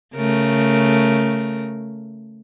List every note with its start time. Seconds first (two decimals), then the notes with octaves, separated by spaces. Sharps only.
0.15 C#3 A3 A#4